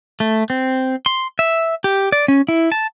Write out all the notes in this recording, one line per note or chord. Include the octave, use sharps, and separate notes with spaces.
A3
C4
C6
E5
G4
D5
C#4
E4
A5